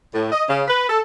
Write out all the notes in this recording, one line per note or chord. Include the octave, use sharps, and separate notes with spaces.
A2
D#5
C#3
B4
A4